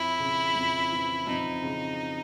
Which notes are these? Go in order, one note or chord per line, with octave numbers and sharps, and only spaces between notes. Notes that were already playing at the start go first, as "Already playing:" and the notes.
Already playing: F2 E4
C#3
F2
E3
F2 D#4
C#3